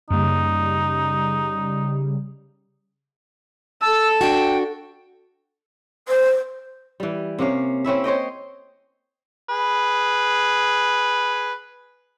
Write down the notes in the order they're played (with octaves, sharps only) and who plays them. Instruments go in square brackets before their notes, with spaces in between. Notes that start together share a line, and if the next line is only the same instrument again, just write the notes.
[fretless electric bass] F#2 A#3 [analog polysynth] C#3 G3 [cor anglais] D#4
[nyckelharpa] A4 A5 [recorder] E6
[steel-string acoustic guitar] D4 F#4 [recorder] G5
[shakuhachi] C5
[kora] E3 G3
C3 A#3 C#4 F5
C4 C#4 E4 E5
C5 C#5 D#5 G5
[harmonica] G#4 B4